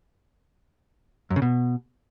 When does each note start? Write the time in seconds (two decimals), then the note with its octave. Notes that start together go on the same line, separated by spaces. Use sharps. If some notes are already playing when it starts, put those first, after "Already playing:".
1.30 F#2
1.36 C#3
1.42 B2